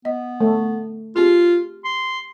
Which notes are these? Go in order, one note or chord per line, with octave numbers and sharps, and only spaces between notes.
B3 D#5
A3
C4 F4 G4 G#4
C6